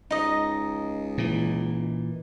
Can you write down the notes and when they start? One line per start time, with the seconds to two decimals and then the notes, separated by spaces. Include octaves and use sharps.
0.11 C#2 D#4 D#5
1.18 A#2 E3